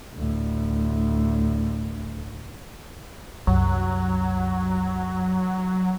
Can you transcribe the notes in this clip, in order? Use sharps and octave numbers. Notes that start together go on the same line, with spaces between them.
D2 A2
C2 F#2 F#3